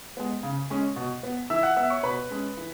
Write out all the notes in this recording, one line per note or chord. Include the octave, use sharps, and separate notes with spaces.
G#3 B3
C#3
G#3 C#4
B2
B3
E3 E5 E6
F#5 F#6
B3 E5 E6
C#5 C#6
B2 B4 B5
G#3 C#4
E3